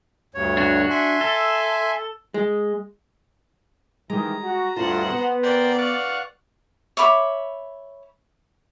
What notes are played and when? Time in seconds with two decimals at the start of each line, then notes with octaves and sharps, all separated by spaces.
0.35 D2 G2 C#5
0.57 D4 F#4
0.90 E5 G#5 C6
1.21 A4
2.34 G#3
4.10 D#3 E3 G#3 G4 A#5
4.42 F#4
4.76 D2 G2 F4 A4 C5 F#5
5.10 B3 B4
5.43 A#4 C5 D5 G5
5.78 F5 F#5 C#6
6.97 C#5 E5 B5 D6